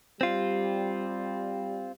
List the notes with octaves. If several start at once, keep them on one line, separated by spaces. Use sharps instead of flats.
G3 C4 F4